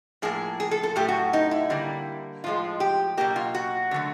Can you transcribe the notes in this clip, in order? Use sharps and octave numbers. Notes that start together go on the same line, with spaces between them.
A2 F3 A#3 G#4
G#4
A4
A4
A2 F#3 A3 G4
F#4
D#4
E4
D3 G3 A#3
A2 F3 G#3 F4
G4
B2 F#3 A#3 G4
F4
F#4
D3 F#3 A3